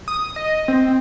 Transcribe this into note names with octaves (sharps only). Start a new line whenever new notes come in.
D#6
D#5
C4